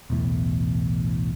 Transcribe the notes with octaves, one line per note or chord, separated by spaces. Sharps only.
E1 B1 E2 A2